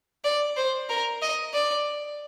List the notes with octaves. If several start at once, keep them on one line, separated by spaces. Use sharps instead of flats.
D5
C5
A#4
D#5
D5